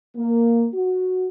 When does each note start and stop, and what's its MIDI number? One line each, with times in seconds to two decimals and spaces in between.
0.16 0.68 58
0.74 1.29 66